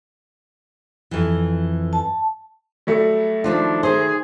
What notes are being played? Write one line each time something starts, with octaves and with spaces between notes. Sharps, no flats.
F2 E3
A5
F#3 G3 A3
D#3 F3 D4 F4
D#3 G#4 C5